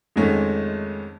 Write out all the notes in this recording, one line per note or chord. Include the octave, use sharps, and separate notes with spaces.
F2 G#2 D#3 G#3 A3 C#4